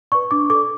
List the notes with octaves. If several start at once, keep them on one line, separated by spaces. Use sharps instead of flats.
B4 D5 C#6
D4 D6
A4 D6
D5